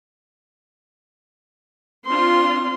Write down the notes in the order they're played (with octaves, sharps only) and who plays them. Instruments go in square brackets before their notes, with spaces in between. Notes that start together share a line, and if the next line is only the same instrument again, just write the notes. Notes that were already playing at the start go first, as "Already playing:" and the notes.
[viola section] C4 D4 F4 [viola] C6